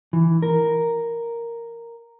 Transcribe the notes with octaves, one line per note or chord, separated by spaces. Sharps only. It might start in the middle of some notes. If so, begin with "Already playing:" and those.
E3
A#4